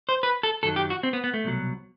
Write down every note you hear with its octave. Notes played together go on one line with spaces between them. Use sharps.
C5
B4
A4
F#2 D#3 F#3 A4
G4
F#4
C4
B3
B3
A3
C2 B2 F#3